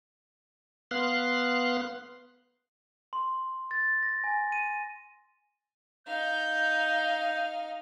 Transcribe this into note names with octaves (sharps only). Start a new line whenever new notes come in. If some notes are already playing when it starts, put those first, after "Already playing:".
B3 F5 C6 F#6
C6
A6
A#6
G#5
D#7
D#4 F5 G6